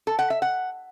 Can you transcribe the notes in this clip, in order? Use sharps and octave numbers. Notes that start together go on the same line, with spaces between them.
A4
F#5
E5
F#5